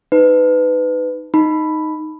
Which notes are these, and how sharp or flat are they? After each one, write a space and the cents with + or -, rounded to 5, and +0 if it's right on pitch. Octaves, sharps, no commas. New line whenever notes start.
D#4 +0 B4 +20
D#4 +0 B5 +0